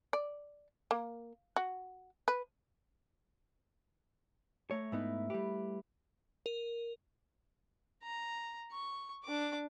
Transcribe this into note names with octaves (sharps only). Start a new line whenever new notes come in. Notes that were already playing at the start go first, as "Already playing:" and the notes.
D5
A#3
F#4
B4
A3 C#5 A#5
G#2 B3 D#4 E4
G3 G4 B4
A#4
A#5
C#6
D4 D6